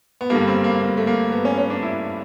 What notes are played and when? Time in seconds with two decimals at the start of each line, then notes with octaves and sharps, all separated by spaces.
0.21 B3
0.30 G2 D3 G3 A#3
0.47 C4
0.64 A#3
0.81 A#3
0.97 A3
1.07 A#3
1.32 B3
1.45 C#4
1.58 C#4
1.70 D4
1.83 E4